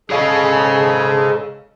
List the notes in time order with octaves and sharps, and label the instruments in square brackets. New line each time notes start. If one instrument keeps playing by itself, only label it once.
[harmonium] G#2 G#3 A4 [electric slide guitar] G#4 C#5 F5